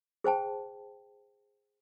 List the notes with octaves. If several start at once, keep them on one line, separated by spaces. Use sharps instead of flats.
G#4 C5 G5 A5